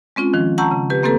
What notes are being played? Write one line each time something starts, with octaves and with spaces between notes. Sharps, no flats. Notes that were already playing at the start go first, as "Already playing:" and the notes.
G#3 C4 C#4 F4
D#3 F3
F#5 A5 A#5 C#6 E6 G6
C#3
G4 B4
A3 A#3 C4 G4 A4 B4